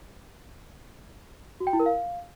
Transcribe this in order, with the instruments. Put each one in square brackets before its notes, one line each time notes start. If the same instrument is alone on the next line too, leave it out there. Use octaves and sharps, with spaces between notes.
[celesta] F#4
G5
E4
A#4
F5